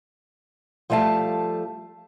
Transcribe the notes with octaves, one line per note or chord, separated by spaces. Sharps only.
F3 G3 A3 F5 A5